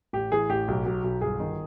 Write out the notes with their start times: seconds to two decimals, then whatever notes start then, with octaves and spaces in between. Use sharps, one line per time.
0.13 A1 G4
0.32 E3 G#4
0.50 A1 G4
0.68 B1
0.86 F#3
1.04 B1
1.21 G1 G#4
1.40 D#3